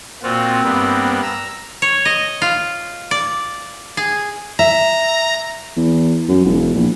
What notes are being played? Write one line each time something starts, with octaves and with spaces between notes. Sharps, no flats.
A#2 C4 F4 F#4
G2 A#3 B3
A#5 E6
C#5
D#5
F4
D5
G#4
E5 A#5
E2
F#2
E1
A#1